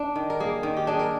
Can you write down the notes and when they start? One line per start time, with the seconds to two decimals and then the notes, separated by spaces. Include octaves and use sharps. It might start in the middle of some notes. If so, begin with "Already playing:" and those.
Already playing: D4
0.15 D#3
0.30 A#4
0.40 A#3 G#4
0.63 D#3
0.77 G4
0.87 D4 G#4
0.99 A#4